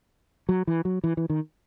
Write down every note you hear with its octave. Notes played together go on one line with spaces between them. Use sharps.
F#3
E3
F#3
E3
E3
D#3